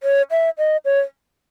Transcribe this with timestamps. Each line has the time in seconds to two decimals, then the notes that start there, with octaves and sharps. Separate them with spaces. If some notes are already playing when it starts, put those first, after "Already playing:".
0.03 C#5
0.31 E5
0.58 D#5
0.85 C#5